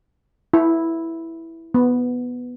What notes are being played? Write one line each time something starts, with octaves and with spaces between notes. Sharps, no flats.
E4
B3